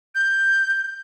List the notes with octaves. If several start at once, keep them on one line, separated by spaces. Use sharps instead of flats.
G6